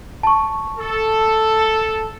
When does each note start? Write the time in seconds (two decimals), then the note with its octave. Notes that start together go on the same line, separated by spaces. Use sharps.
0.23 A5 C#6
0.78 A4